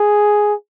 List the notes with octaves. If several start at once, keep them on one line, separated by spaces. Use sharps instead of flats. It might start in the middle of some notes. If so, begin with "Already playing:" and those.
Already playing: G#4